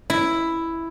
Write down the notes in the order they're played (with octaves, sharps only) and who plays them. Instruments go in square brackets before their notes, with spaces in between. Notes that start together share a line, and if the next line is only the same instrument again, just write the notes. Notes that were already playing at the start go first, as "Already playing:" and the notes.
[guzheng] E4